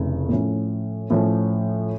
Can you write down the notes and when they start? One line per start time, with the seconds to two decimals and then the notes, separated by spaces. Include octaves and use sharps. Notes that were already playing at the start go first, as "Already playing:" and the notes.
Already playing: F1 C#3 E3 A3
0.29 A2 F3 C#4
1.10 A2 F3 C#4